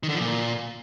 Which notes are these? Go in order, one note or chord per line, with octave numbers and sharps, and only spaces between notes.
D#3
D3
F3
A#2